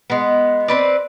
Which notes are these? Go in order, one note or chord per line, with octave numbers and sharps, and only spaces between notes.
G#3 B3
C4 B4 D5